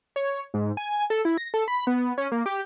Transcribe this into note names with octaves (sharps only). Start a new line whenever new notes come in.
C#5
G#2
G#5
A4
E4
A#6
A4
B5
B3
C#4
A#3
G4